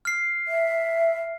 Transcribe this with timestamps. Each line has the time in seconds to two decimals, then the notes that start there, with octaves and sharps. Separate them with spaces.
0.05 F6 C7
0.48 E5